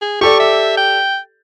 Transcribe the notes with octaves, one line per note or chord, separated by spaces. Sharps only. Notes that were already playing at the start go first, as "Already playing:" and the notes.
G#4
G4 A4 D5 C#6
E5
G5